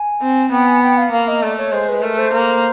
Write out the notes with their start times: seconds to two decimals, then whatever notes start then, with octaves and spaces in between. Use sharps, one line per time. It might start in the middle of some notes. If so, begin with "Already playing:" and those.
Already playing: G#5
0.21 C4
0.52 B3 G5
0.66 G#5
0.82 G5
0.97 F5
1.12 A#3 F5
1.27 D#5
1.42 A3 D5
1.57 C#5
1.72 G#3 C5
1.88 B4
2.03 A3 A#4
2.17 C5
2.33 A#3